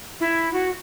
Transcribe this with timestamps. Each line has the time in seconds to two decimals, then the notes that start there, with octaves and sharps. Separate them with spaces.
0.20 E4
0.53 F#4